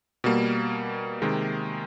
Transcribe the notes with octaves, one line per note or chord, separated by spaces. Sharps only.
B2 G3 A#3
C3 D#3 G#3